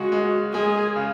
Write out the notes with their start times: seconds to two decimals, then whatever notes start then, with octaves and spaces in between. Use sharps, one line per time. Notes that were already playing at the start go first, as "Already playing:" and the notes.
Already playing: C#3 G#3 F#4
0.12 G#3
0.54 G#3 G#4
0.96 C#3